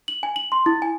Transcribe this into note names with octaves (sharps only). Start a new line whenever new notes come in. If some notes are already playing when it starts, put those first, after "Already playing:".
F#7
G#5
F#7
C6
E4
G#5